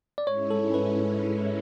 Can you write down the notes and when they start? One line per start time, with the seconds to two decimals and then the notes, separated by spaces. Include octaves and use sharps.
0.18 D5
0.27 G#2 G#3 C#4 E4 C#5
0.50 A4
0.74 B4